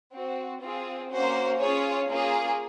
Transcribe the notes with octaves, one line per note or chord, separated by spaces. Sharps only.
C4 F#4
C4 F4 G#4
A#3 C#4 F#4 C5
C#4 F4 G#4 C#5
A#3 C#4 F4 G#4